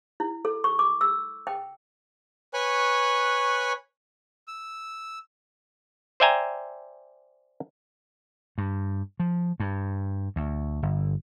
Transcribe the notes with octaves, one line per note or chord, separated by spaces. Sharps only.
E4
A4
C#6
D6
E6
G5
B4 C#5 G#5 C#6 F#6
E6
C5 D5 E5 G5 G#5 A#5
G2
F3
G2
D2
G1